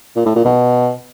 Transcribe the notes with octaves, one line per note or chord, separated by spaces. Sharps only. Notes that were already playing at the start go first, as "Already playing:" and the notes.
A#2
A2
A#2
B2